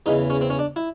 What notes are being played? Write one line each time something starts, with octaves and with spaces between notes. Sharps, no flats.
E2 C#3 E3 D#4
C#4
C4
C#4
D4
E4